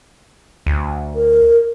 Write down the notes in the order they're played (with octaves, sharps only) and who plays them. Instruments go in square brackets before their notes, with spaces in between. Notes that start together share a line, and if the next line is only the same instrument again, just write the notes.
[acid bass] D2
[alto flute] A#4